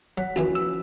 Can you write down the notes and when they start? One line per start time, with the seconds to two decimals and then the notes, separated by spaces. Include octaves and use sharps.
0.18 F#3 F#5 F#6 B6
0.36 D#2 E3 F3 C#4 E4 F#4 A5
0.55 E6